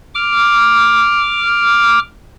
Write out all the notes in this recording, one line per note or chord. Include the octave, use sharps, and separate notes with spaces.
D6 F6